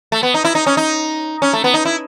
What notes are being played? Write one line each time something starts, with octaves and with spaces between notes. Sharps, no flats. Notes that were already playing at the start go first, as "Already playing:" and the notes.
A3
B3
D#4
E4
D#4
C#4
D#4
C#4
A3
B3
D#4
E4